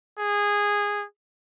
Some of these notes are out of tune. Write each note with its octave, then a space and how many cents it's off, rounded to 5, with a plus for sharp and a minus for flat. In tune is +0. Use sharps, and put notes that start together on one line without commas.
G#4 -15